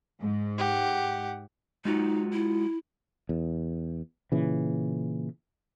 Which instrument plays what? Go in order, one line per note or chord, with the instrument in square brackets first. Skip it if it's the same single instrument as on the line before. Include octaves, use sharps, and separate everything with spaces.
[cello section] G#2
[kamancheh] G4 F#5
[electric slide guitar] G#3 F4 F#4 [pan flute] D#4
[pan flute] E4
[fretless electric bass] E2
A#2 C#3 E3